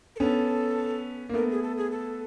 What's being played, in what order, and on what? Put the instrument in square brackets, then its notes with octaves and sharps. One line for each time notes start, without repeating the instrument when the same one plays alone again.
[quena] A#4
[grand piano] B3 C#4 [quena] A4
[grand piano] A#3
[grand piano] A3 B3 [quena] A#4
[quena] G#4
A4
G#4
A4